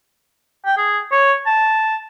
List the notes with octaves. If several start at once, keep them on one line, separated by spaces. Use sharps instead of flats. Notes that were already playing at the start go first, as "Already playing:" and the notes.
G5
G#4
C#5
A5